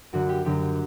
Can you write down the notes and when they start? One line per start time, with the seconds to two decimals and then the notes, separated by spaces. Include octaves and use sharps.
0.13 F#2 D3 F#3 F#4
0.29 G4
0.45 F#2 D3 F#3 G4